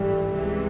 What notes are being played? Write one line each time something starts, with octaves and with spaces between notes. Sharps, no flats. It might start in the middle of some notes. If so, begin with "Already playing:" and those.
Already playing: A1 G#2 E3 G3 A3
C#2 C3 E3 G#3